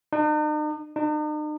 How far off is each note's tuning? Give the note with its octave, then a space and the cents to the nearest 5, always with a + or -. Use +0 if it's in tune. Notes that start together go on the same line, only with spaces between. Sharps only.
D#4 -45
D#4 -45